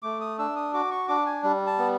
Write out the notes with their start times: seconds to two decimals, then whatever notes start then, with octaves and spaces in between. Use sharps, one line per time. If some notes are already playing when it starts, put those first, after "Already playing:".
0.03 A3 D6
0.21 D#6
0.39 D4 E6
0.56 D#6
0.73 F#4 D6
0.91 C#6
1.08 D4 D6
1.26 G#5
1.43 G3
1.67 A5
1.79 B3